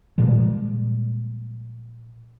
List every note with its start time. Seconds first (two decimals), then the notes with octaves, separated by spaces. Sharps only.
0.18 A#2 F3 G3 G#3